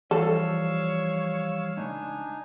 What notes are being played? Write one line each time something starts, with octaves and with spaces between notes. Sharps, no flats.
E3 F3 G3 A4 C#5 F5 E6
C#2 G#2 D4 D#4 G#5